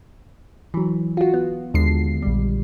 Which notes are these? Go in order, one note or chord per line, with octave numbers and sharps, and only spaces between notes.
E3 F#3
F4 F#4
B3
D#2 D3 G#3 C7
A#1 G3